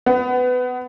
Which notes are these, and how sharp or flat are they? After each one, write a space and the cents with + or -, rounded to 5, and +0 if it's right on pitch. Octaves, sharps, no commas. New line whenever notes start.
B3 +25